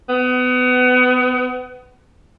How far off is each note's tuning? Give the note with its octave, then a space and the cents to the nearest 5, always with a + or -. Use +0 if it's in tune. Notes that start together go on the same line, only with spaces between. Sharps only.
B3 +30